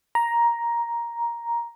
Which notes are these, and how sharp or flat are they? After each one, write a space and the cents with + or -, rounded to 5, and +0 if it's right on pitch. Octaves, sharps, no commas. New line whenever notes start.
A#5 +10